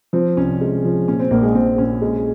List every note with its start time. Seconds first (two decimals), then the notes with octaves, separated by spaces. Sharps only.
0.13 F3 C4
0.37 C2 C#4
0.61 G#3
0.85 F3
1.08 A#2 C#4
1.19 C4
1.31 A#1 A#3
1.43 G#3
1.54 A#2 C4
1.78 A#2 C#4
2.01 G#3